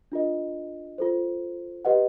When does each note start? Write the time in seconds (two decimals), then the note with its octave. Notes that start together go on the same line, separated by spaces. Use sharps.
0.12 D4 F4 A#4 D#5
0.98 F4 A4 C5
1.85 G4 B4 D#5 F#5